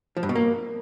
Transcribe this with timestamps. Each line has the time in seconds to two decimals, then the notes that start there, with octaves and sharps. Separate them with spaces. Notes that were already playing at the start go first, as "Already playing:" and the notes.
0.17 F3
0.23 G2
0.29 B2
0.36 A#3